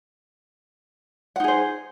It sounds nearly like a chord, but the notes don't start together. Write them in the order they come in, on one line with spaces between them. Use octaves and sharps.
F#5 D#4 G#4 C5